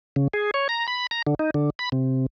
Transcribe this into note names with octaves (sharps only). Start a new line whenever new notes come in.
C#3
G#4
C#5
A#5
B5
A#5
D3
D#4
D3
B5
C3